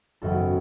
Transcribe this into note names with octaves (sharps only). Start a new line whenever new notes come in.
G#1 F#2 C#3 F#3 B3 A4